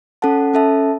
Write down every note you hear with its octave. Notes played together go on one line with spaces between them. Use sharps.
C#4 A4 F#5 A5
C#4 A4 E5 A5